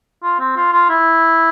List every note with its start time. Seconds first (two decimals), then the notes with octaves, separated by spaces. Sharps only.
0.23 F4
0.40 C4
0.56 F4
0.73 F4
0.90 E4